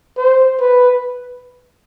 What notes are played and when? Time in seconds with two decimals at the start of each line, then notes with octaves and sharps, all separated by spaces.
0.17 C5
0.60 B4